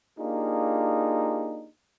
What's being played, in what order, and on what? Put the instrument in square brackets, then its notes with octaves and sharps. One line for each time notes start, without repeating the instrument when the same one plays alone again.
[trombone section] A#3 D4 D#4 F4 G4 G#4